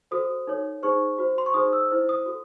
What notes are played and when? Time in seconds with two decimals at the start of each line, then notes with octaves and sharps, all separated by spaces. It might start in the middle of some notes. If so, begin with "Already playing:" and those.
0.11 F#4 A4 C5 D#6
0.47 D#4 A4 C#5
0.83 D#4 G#4 C5 C#6
1.18 F#4 C5
1.38 C6
1.46 C#6
1.54 D#4 G#4 C5 D#6
1.73 E6
1.91 E4 C5
2.09 D#6
2.26 F#4 A4